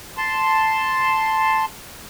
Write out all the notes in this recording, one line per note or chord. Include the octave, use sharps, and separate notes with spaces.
A5 C6